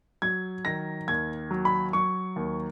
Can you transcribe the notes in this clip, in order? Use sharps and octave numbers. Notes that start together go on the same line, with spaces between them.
F#3 G#6
D#3 A#6
D#2 G#6
F#3
B5
F#3 C#6
D#2